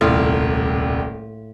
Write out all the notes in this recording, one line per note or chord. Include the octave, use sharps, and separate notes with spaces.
D#1 C2 A2 F4